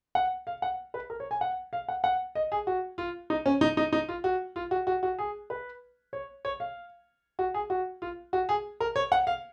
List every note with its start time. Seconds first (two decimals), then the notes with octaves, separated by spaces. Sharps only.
0.15 F#5
0.47 F5
0.62 F#5
0.94 B4
1.10 A#4
1.20 C#5
1.31 G#5
1.41 F#5
1.73 F5
1.88 F#5
2.04 F#5
2.35 D#5
2.52 G#4
2.67 F#4
2.98 F4
3.30 D#4
3.46 C#4
3.61 D#4
3.77 D#4
3.93 D#4
4.09 F4
4.24 F#4
4.56 F4
4.71 F#4
4.87 F#4
5.03 F#4
5.19 G#4
5.50 B4
6.13 C#5
6.45 C#5
6.60 F5
7.39 F#4
7.54 G#4
7.70 F#4
8.02 F4
8.33 F#4
8.49 G#4
8.80 A#4
8.96 C#5
9.12 F#5
9.27 F5